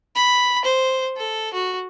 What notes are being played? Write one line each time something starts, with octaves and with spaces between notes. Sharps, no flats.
B5
C5
A4
F#4